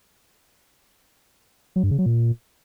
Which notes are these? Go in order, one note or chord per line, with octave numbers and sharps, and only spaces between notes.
F#3
G2
C#3
F#3
A#2